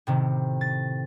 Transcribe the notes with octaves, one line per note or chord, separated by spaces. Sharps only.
A2 C3 D#3
A6